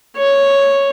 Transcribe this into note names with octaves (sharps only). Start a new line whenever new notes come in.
C#5